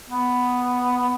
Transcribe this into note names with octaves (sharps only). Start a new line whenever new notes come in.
B3